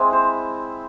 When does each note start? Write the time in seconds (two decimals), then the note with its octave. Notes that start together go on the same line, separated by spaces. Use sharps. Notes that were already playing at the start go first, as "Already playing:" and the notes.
Already playing: G#3 C4 E4
0.13 C5